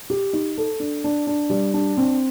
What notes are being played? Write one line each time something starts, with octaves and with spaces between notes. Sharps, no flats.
G4
D#4
A4
D4
D4
D4
G3
D4
C4